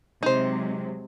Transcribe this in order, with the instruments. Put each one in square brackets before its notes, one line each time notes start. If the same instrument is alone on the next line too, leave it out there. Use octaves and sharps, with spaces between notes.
[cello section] C3 F#3 G#3 [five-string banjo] D#4 C5